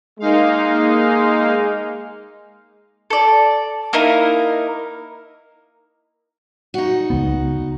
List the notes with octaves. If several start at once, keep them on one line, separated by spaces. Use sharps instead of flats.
G#3 A#3 D#4 F5
A4 D5
A#3 D#4 E4 A#4
D#4 F#4
C#2 B3